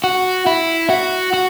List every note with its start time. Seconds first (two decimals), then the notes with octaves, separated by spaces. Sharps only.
0.04 F#4
0.47 E4
0.90 F#4
1.34 F#4